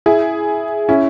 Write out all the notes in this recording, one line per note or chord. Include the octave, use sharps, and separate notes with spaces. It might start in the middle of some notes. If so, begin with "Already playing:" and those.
E4 G#4
C#4 E4